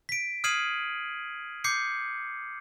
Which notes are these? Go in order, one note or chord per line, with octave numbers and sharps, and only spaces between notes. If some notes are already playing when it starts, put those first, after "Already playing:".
B6 D7
D#6 F6 G#6 C7 D#7 F#7
D6 G6 C7 C#7